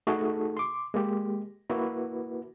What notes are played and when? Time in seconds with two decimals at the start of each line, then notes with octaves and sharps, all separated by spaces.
0.07 A3 D#4 F#4 G#4 A4
0.57 C6 D6
0.94 G#3 A#3 G4
1.70 A#3 E4 F#4 B4